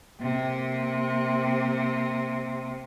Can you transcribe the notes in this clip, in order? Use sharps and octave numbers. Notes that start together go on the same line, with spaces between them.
C3 A#3